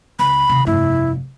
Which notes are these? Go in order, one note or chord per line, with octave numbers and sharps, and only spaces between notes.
C#2 B5
D#2 C3
F1 G2 E4